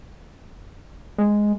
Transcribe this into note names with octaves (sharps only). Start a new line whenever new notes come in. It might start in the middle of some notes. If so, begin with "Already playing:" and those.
G#3